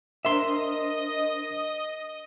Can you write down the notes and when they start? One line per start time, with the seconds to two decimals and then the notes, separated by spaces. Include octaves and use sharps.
0.25 D4 A#4 C5 D#5 E5 C6